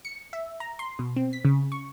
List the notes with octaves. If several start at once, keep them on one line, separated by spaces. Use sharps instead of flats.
C#7
E5
A#5
C6
B2
C4
B6
C#3
C#6